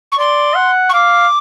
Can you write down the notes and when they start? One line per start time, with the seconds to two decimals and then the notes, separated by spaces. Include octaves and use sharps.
0.12 C#6
0.19 D5 C6
0.56 F#5
0.89 C#6
0.93 F5 D6